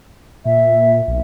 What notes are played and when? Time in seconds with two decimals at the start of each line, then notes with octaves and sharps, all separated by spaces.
0.46 A#2 E5
1.08 B1